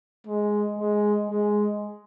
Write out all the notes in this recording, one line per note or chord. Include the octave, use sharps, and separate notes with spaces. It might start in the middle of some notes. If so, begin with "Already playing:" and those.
G#3
G#3
G#3